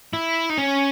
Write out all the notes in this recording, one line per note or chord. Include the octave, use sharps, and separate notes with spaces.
E4
D#4
C#4